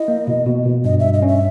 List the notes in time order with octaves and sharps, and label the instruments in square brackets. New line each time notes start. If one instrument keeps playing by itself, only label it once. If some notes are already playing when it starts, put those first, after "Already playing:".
Already playing: [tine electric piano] E4 [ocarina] D#5
[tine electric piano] A#3
B2
B2
B2
[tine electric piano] G2 [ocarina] D#5
[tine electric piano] G2 [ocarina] E5
[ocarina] D#5
[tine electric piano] C#4
[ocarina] E5